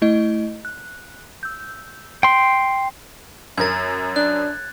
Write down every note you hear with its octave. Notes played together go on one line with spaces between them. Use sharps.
A3 E4 D#5
F#6
E6 G6
G5 C6
F#2 A#4 G#6 A6
D4 F#6